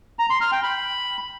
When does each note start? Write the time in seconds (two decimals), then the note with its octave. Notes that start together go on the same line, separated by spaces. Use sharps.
0.19 A#5
0.30 C6
0.41 F6
0.52 G5
0.63 B5